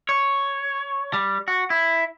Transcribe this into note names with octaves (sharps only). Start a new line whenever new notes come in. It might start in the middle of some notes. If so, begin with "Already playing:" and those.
C#5
G3
F#4
E4